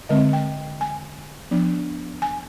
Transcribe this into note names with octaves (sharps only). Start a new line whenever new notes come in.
D3 G#3 C4 D#5
G5
G#5
F3 B3 D4
G#5